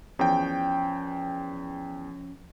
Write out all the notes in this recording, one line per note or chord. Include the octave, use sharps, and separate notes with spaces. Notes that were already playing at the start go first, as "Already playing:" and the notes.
E2 F3 C#4 G5